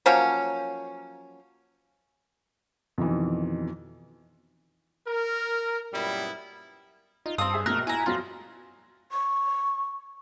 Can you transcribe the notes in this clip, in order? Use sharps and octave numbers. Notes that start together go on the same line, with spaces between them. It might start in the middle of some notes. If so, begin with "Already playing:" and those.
F3 F#3 A#3 C#4
F2 B2 D#3 E3
A#4
F#2 A#2 G3 B3 E4
D#4 F4
G2 C4 F5 A5 D#6 E6
G#4 E5
A#1 B2 A3 A#4 F#6
E4 G#5 A#5
F2 F#3 B3 F4 A#6
C#6